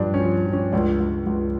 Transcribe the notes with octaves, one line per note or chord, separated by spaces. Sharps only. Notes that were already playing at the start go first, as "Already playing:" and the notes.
Already playing: G2 F3 D4
C#4
F3
F3
C#4
C#2 D4
C#2
C#2